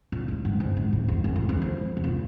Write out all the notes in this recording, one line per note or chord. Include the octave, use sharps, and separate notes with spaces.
A#2
G#2
G2
G#2
G#2
A2
F2
F#2
F2
E2
F2
B2
A#2